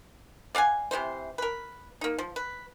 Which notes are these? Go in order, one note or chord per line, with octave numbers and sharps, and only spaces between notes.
D5 F5 F#5 G#5
C3 E3 A#3 C5
A#4 B4
A#3 D#4
F3
B4